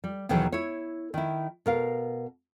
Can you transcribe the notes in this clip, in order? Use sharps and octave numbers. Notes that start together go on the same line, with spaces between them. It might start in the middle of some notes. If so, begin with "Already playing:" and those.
G3
D#2 B2 D#3 E3 F#3 G#4
E4 C#5
D#3 E4
B2 A#4 F5